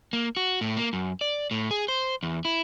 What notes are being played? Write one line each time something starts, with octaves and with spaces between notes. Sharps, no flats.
A#3
F#4
A2
A#3
F#2
D5
A2
G#4
C5
E2
E4